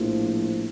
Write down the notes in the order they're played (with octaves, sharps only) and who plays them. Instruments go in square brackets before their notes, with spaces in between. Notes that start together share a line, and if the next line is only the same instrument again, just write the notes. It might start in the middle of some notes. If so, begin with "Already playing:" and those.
Already playing: [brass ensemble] A#1 A2 F3